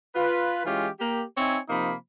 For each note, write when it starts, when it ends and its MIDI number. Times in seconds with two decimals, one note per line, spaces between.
0.15 0.61 65
0.15 0.61 71
0.65 0.87 52
0.65 0.87 56
0.65 0.87 61
0.65 0.87 65
0.65 0.87 67
1.00 1.23 58
1.00 1.23 67
1.37 1.57 60
1.37 1.57 63
1.37 1.57 73
1.37 1.57 76
1.37 1.57 80
1.69 1.93 48
1.69 1.93 53
1.69 1.93 58
1.69 1.93 63
1.69 1.93 83